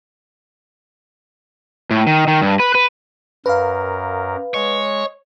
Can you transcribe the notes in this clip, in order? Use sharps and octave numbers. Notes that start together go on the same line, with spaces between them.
A2
D#3
D#3
G2
B4
B4
F#2 A#4 B4 F5
G#3 C#5